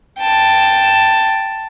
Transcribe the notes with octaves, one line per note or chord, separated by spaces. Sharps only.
G5 A5